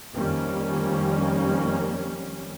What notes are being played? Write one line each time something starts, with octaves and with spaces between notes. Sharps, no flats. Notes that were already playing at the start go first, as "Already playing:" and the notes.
F2 D#3 G3 A#3 C#4